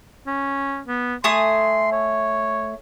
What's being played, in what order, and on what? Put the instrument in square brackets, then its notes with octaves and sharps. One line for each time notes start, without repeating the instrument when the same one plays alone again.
[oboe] C#4
B3
[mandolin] A3 G#5 D#6 [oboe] C6
[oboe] C#5